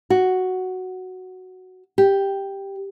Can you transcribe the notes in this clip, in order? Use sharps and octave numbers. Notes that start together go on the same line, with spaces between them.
F#4
G4